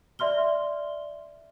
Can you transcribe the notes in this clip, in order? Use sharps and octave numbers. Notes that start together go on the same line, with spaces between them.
D5 E5 C6 F6 G7